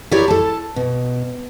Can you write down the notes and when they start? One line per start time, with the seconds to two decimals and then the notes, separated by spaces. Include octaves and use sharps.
0.11 E4 G4 A#4 C#5 D5
0.28 A4 A5
0.76 B2